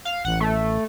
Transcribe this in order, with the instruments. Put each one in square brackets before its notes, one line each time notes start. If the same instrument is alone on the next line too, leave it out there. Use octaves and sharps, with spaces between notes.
[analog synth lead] F5
[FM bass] A1 [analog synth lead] F#5
[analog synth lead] A3